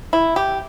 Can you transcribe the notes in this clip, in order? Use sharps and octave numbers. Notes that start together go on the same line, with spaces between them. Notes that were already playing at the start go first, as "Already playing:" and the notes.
E4
G4